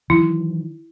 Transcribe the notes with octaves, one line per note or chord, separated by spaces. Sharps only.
D#3 E3 F#3 E4